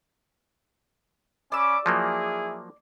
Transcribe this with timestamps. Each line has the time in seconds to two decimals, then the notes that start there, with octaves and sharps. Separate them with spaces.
1.52 C#4 D5 B5 D6 E6
1.86 F3 F#3 A#3 E4 G#4